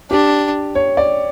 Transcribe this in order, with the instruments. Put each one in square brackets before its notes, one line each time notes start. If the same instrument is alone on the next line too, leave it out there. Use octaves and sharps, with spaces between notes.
[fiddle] D4 [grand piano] G4
[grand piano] C#5
D5